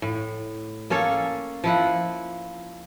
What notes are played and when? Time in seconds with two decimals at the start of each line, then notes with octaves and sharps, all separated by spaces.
0.02 A2
0.90 A#3 C#4 A4 C#5
1.64 F3 E4 F#5